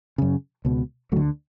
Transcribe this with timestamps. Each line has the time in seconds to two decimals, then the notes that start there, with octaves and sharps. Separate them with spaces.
0.18 F#2 C#3
0.65 C#2 B2
1.12 D2 F#3 A3
1.16 D3